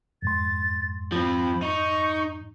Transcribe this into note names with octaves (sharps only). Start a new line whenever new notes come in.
F2 G#2 C6 A6
F3 C4 B5
D#4 C#6